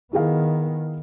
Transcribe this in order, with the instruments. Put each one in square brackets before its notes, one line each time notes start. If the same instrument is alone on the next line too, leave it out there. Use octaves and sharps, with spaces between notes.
[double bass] D#3 B3 [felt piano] E4 G#4 F5